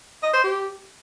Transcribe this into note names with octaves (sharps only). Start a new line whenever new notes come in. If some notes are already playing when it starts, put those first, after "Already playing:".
D#5
C5
G4